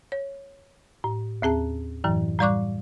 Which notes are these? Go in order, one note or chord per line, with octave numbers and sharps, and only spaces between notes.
C#5
A2
D#2 C4 G#4 A5
F#2 A2 E3 F#3
A2 G3 D5 C#6 D6 F#6